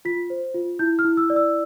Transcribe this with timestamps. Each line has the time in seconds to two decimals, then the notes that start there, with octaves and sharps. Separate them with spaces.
0.05 F4 B6
0.30 C5
0.54 F4
0.79 E4 G6
0.99 F6
1.05 E4
1.17 E6
1.30 D5
1.36 E6